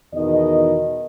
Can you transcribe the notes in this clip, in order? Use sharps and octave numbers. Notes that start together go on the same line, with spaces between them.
E2 B2 D#3 D#5